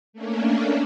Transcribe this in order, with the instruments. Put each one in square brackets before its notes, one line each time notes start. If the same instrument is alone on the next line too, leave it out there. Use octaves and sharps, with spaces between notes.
[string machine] A3 A#3 C#4 D4